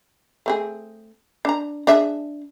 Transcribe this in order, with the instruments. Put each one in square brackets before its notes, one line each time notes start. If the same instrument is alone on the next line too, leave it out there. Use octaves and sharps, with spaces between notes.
[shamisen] A3 C4 G#4
D4 A#5
D4 G#4 E5